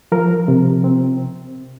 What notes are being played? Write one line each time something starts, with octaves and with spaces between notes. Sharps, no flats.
F3 A#4
C3
C4